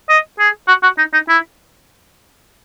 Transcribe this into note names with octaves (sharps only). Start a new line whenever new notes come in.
D#5
G#4
F#4
F#4
D#4
D#4
E4